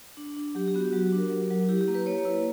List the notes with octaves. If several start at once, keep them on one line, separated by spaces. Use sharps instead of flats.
D4
D4
F#3 G4
G4
B3 F#4
G4
F#3 F#4
G4
D4
A#4
F#3
F#3
E4 G4
G4
A#3
B4
A#3 C#5
E4